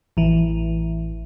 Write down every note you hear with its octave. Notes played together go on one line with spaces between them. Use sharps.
A1 E3